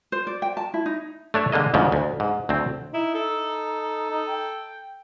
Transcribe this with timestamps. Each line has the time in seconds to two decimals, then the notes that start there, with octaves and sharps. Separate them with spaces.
0.12 C5
0.27 D5
0.42 G5
0.57 A5
0.74 E4
0.86 D#4
1.34 A3 D4 C#5 E5
1.52 D3 G#3 A#3 D#5
1.74 D2 G#2 C#3 F3
1.92 D2
2.20 G#2
2.49 D2 A3 C4
2.94 D#4 E4
3.15 A4
4.10 D#4
4.28 G5